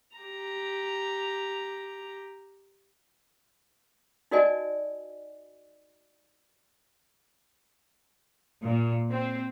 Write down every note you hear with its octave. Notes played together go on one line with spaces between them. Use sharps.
G4 A#5
D#4 F#4 A#4 D5 D#5 G#5
A#2
C4